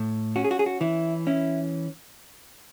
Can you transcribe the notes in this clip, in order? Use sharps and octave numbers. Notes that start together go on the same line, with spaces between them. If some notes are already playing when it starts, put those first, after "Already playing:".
Already playing: A2
C#4 F#4
G#4
F#4
G#4
F#4
E3 E4
C#4 E4